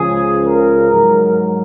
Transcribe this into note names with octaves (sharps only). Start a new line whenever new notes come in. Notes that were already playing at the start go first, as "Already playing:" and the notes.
Already playing: C#2 C#3 F3 G#4
A#4
G#2 F#3